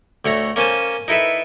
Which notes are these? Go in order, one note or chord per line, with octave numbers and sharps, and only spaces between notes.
D2 A3 C#5 A#5
A#3 C#4 C5 G#5 A5
D#4 E4 A4 B4 E5